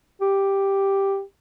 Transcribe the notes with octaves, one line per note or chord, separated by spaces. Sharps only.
G4